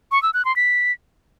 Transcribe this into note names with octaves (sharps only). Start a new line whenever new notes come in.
C#6
E6
F#6
C6
B6